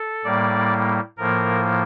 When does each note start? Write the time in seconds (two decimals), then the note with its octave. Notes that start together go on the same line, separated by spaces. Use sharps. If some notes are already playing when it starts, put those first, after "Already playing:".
Already playing: A4
0.24 A2 G3 A#3 D5
1.18 A2 F3 A#3 A#4